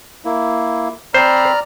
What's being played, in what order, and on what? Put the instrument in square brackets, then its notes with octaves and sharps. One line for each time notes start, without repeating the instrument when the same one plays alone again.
[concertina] A#3 E4
[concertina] C4 B5 [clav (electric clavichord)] C5 [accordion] D5 A#5 F6